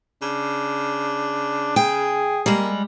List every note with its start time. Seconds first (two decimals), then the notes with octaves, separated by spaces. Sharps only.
0.22 C#3 D4
1.76 G#4 G5
2.46 G3 G#3 A#3